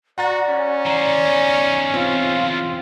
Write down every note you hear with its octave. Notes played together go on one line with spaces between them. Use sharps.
F#4 D5 F#5 A#5 A6
C#4
E3 C5 D5 A#5
E2 D#4
C4 F4